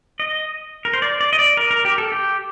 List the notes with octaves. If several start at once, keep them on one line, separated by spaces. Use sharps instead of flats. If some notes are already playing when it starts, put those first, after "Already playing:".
D#5
A#4
C5
D5
D5
D#5
D5
A#4
A#4
G4
A4
G4